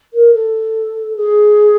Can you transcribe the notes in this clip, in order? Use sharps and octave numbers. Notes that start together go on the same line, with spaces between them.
A#4
A4
G#4